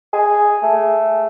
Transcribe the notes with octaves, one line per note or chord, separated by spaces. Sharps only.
G#4
A3